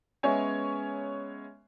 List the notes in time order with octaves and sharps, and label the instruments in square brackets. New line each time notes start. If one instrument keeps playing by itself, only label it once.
[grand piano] G#3 B3 C#4 C#5 E5 G#5